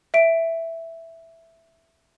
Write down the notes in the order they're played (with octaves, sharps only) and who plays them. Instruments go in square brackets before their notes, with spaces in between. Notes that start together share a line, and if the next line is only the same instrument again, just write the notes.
[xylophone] E5 D7